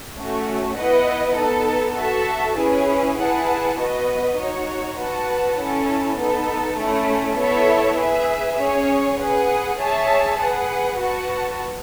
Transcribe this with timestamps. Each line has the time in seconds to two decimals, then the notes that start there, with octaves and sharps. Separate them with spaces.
0.18 A3 C#4 F#4
0.77 B3 E4 B4 D#5 F#5
1.38 B3 D#4 A4
1.97 F#4 A4 E5 A5
2.58 C#4 E4 G#4 B4
3.18 E4 G#4 B4 F#5 A5
3.78 B3 F#4 B4 D#5
4.38 D#4 F#4 C#5
4.98 F#4 B4 F#5 A5
5.58 C#4 E4 A4
6.19 B3 D#4 A4
6.78 A3 C#4 E4
7.38 B3 E4 A4 C#5 E5
7.98 G#4 B4 E5
8.59 C#4 G#4 C#5
9.19 G#4 B4 F#5
9.79 G#4 C#5 E5 A5
10.39 G#4 B4 F#5
10.99 F#4 B4 F#5 A5